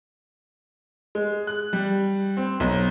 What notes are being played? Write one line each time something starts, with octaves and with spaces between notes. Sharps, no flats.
G#3
F#6
G3
C4
B1